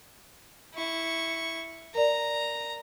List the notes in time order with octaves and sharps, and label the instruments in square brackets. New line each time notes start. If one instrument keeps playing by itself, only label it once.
[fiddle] E4 C#6
[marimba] A#4 D5 [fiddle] A#5